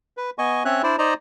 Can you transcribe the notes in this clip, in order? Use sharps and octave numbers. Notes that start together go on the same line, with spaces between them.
B4
B3 D#5 G#5 C#6
C4 C#4 C#5 E5 F#6
D4 E4 C5 D5
D#4 C5 D5 D#5 A#5